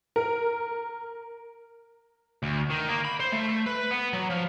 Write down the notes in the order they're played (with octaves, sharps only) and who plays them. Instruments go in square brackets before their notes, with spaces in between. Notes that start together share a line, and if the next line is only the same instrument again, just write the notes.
[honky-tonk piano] A#4
[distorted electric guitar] D2
D#3
A#3
B5
C5
A3
B4
B3
F#3
F3